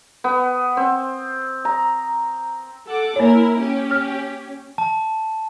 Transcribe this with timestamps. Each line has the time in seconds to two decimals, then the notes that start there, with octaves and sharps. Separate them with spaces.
0.24 B3
0.77 C4
1.65 A#5
2.86 A4 F#5 D6
3.16 A#3 E4 A#4 C#5
3.58 C#4 G4
3.91 F6
4.78 A5